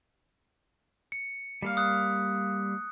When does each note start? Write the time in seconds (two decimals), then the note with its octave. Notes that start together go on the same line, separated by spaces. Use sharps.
1.12 C#7
1.62 G3 A#3 F5
1.77 D#6 F#6